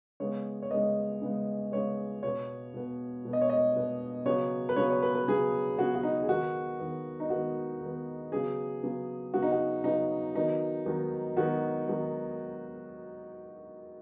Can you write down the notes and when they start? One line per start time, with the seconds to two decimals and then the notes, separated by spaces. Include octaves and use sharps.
0.20 C#3 G#3 B3 C#5
0.62 C#5
0.71 C#3 G#3 B3 D#5
1.22 C#3 G#3 B3
1.72 C#3 G#3 B3 C#5
2.23 B2 B3 C#5
2.74 B2 B3
3.25 B2 B3
3.33 D#5
3.41 C#5
3.50 D#5
3.76 B2 B3
4.26 C#3 F#3 B3 C#5
4.69 B4
4.76 C#3 F#3 B3 C#5
4.90 C#5
5.03 B4
5.15 B4
5.28 C#3 F#3 B3 G#4
5.78 C#3 F#3 B3 F#4
5.95 F#4
6.03 D#4
6.22 G#4
6.29 D#3 B3 F#4
6.80 D#3 B3
7.20 D#4
7.30 D#3 B3 F#4
7.81 D#3 B3
8.32 C#3 F#3 B3 G#4
8.83 C#3 F#3 B3
9.34 C#3 F#3 B3 F#4
9.43 D#4
9.52 F#4
9.84 C#3 F#3 B3 D#4
10.35 D#3 F#3 B3 D#4
10.86 D#3 F#3 B3
11.36 D#3 F#3 B3 F#4
11.87 D#3 F#3 B3